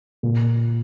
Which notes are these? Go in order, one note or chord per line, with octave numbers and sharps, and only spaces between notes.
A#2